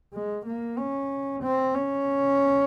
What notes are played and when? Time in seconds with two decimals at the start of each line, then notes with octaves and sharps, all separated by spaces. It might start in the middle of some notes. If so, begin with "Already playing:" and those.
0.14 G#3
0.46 A#3
0.78 C#4
1.43 C4
1.75 C#4